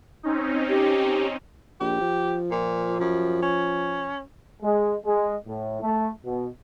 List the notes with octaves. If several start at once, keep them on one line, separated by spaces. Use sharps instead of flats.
C4 C#4 D#4
G4
A#1 G4
F3
A#2
F#2
C#4
G#3
G#3
A2
A3
B2